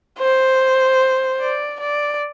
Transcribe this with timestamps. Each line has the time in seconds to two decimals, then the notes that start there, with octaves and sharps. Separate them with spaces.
0.19 C5
1.40 D5
1.80 D5